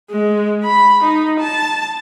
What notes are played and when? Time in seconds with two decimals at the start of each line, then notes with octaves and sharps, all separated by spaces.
0.10 G#3
0.65 B5
1.03 D#4
1.40 A5